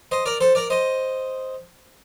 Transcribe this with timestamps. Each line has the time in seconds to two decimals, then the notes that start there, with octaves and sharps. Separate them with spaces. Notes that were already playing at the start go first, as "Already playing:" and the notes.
0.11 C5 D#5
0.26 A#4 D5
0.41 A4 C5
0.55 A#4 D5
0.70 C5 D#5